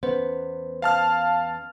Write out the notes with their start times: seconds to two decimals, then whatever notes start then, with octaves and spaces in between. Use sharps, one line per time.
0.03 E2 B3 C#4 C5
0.82 F5 A5 F6